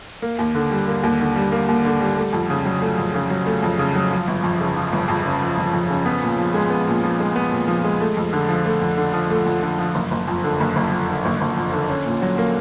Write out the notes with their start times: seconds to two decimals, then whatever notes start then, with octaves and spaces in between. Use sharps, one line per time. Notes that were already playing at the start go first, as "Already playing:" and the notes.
0.22 A#3
0.39 D#2
0.55 D3
0.71 G3
0.88 A#3
1.03 D#2
1.20 D3
1.36 G3
1.52 A#3
1.68 D#2
1.85 D3
2.01 G3
2.17 A3
2.33 F2
2.50 C#3
2.65 F#3
2.82 A3
2.98 F2
3.15 C#3
3.30 F#3
3.47 A3
3.63 F2
3.79 C#3
3.95 F#3
4.11 F3
4.27 G1
4.44 F2
4.60 C#3
4.76 F3
4.92 G1
5.08 F2
5.25 C#3
5.41 F3
5.58 G1
5.73 F2
5.90 C#3
6.06 B3
6.22 A#2
6.39 F3
6.54 G#3
6.70 B3
6.87 A#2
7.03 F3
7.20 G#3
7.36 B3
7.52 A#2
7.68 F3
7.84 G#3
8.01 A3
8.17 F2
8.33 D3
8.49 F3
8.66 A3
8.81 F2
8.97 D3
9.13 F3
9.30 A3
9.46 F2
9.62 D3
9.79 F3
9.95 F#1
10.11 F#1
10.28 F2
10.44 D3
10.60 F#1
10.76 F#1
10.92 F2
11.08 D3
11.25 F#1
11.41 F#1
11.57 F2
11.73 D3
11.90 C#4
12.05 A#2
12.22 F#3
12.38 A#3